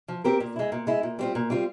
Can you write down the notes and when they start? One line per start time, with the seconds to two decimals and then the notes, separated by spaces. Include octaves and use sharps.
0.08 F3
0.24 C4 G4 A#4
0.40 A#2
0.56 G#3 E4
0.72 A#2
0.87 G#3 E4
1.03 A#2
1.19 G3 C4 F4
1.35 A#2
1.50 G3 C4 F4